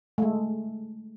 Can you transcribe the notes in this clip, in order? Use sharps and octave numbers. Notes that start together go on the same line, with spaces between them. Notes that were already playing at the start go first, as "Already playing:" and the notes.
G#3 A3